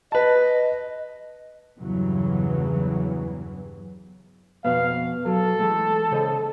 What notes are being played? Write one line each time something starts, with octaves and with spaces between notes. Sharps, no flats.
B4 D#5 A5
E2 G2 C#3 E3 F#3
F2 B2 B3 F5
F#3 A4
E3 G#3 A3
C#3 C5 D#5